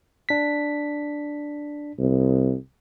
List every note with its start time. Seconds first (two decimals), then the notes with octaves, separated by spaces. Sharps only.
0.29 D4 B6
1.99 C2